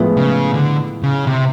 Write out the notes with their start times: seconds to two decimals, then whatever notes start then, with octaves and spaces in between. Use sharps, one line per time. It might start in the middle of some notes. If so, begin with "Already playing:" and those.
Already playing: A2 F3 G#3 B3 E4
0.18 C#3
0.54 D3
1.03 C#3
1.27 C3